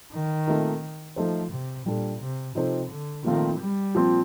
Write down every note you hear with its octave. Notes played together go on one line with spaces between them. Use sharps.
D#3
A#2 A3 C4 D#4 A#4
F3 A3 D#4 A4 C5
C3
A#2 G3 D4 A4
C3
C3 F3 C4 D#4 A4 C5
D3
A#2 D#3 F3 A3 C4 F4
G3
A#2 F3 C4